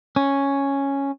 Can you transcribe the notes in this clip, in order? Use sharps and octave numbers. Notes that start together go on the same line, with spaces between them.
C#4